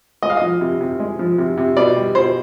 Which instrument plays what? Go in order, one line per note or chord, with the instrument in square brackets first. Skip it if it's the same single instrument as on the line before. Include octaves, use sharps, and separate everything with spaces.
[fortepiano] G#3 D#5
F5
F3 D#5
C3
C3
G#3
F3
C3
C3
B2 D5
G3
B2 C5